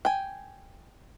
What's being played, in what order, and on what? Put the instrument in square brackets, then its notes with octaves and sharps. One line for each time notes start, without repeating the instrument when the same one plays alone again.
[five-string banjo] G5 G#5